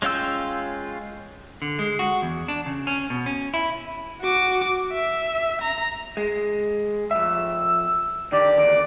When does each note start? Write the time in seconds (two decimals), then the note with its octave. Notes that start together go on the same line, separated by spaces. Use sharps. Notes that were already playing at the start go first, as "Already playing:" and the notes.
0.02 G#3 C#4 F4 G5 E6
1.62 D3
1.79 G#3
1.99 F#4
2.22 E2
2.48 D4
2.66 C#3
2.87 C#4
3.10 B2
3.26 C#4
3.54 E4
4.21 F#4 D6
4.93 E5
5.61 A#5
6.17 G#3
7.11 F2 E5 E6
8.32 D3 D#3 G4 D5
8.59 E2 D#3 D6